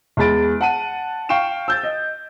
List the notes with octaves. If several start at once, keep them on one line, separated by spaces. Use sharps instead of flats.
E2 G#3 B5 A6 D7
F#5 A5 D#7
F5 G5 C#6 D7 E7
E6 G6 A6
D#5